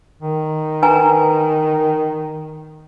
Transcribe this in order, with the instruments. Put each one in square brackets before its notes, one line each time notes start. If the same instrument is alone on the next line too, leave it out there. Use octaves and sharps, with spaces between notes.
[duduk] D#3
[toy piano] B4 G#5 A#5